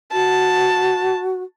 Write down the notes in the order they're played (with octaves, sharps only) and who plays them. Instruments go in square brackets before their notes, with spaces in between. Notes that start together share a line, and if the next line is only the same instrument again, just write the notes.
[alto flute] F#4 [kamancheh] A5